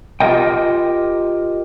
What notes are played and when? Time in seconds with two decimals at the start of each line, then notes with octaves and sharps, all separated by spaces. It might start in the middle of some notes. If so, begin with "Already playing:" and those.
0.20 F4 G4 A4 A#4 D#5 G5